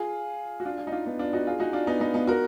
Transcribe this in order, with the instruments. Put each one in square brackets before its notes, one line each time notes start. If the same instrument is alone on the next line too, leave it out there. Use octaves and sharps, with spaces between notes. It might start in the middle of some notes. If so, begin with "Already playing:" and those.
Already playing: [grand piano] F4 G#4
F#4
D4 F4
D4 F4
D#4
D4 F4
B3 D#4
D4 F4
D#4 F#4
F4 G#4
D#4 F#4
D4 F4
B3 D#4
B3 D#4
B3 D#4
F#4 A#4